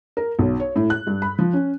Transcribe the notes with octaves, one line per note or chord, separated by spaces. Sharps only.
A#4
B1
C#5
A2
F#6
G2
B5
F3
C#4